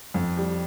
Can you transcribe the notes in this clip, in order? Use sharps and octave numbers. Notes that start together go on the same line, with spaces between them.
F2
G3